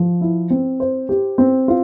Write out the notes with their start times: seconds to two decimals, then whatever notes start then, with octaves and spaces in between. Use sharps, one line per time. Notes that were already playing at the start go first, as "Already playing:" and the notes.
Already playing: F3
0.21 E4
0.50 C4
0.80 C5
1.09 G4
1.38 C4
1.68 F4